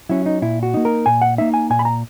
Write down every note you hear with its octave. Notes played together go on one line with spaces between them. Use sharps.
F#3 C#4 E4
D#4
A#2 E4
F#4
A#3 D#4
A#4
A#2 G#5
F#5
A#3 D#4 E5
G#5
A#2 G#5
B5
A#5